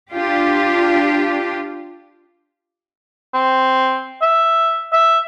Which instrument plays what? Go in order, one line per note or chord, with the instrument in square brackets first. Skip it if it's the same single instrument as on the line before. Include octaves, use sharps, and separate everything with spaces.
[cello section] D4 F4 G4
[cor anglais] C4
E5
E5